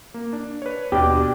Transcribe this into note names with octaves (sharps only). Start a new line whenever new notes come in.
A#3
D4
B4 C#5
D#2 B2 D4 G4 D5